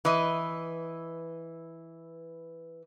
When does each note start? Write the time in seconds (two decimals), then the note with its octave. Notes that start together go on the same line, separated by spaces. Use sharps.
0.05 E3 B4 D#5